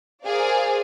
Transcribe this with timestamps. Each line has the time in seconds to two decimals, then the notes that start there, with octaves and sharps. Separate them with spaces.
0.24 G#4 A#4 C5 D5 F5